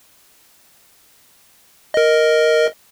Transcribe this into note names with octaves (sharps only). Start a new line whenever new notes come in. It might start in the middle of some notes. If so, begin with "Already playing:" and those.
A#4 D#5